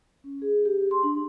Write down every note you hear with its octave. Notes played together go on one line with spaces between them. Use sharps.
C#4
G#4
G4
C6
D4